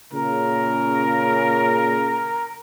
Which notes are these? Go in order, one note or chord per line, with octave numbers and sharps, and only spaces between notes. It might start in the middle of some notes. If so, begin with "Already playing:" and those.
A#2 C#3 A#4